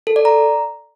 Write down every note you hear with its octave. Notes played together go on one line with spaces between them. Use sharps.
A4
D5
A#5